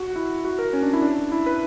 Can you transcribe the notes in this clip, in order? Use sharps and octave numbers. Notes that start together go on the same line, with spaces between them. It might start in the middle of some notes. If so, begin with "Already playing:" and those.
Already playing: F#4
E4
F#4
A#4
C#4
D4
E4
D4
E4
B4